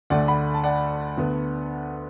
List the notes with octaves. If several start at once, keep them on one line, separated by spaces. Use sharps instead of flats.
D2 D3 A3 D5 F#5
F#5 B5
A5
D5 F#5
D2 D3 B3